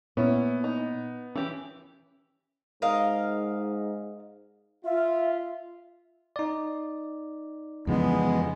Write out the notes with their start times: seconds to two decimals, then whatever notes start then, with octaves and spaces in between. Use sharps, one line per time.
0.17 A#2 B3 C#4 E4
0.64 D#4
1.36 E3 C#4 G4
2.82 G#2 A#4 D#5 F5
4.84 F4 E5
6.36 D#4 D5
7.87 F2 C#3 E3 G#3 B3